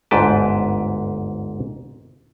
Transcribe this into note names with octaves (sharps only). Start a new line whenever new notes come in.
G1 D2 G#2 B4 G5 A5